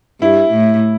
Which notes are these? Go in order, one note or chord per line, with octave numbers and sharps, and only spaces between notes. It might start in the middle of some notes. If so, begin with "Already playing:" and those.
G2 E4
A2